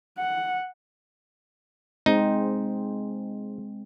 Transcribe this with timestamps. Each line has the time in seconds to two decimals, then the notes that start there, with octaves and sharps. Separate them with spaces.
0.17 F#5
2.06 G#3 C4 D#4